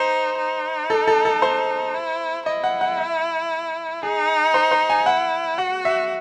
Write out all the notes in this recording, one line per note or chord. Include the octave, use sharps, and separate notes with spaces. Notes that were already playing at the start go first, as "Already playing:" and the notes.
Already playing: D#4 C5
D#4
A4
A4
A4
C5
E4
E4 D#5
F#5
F#5
E5
D#4 G#4
C5
C5
G#5
E4 F#5
F#4 F#5
E5